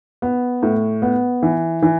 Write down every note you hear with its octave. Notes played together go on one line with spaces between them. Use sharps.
B3
A2
B3
E3
E3